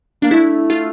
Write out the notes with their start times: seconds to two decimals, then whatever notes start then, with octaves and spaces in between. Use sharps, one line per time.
0.22 A#3 D4
0.31 A3 E4
0.70 F4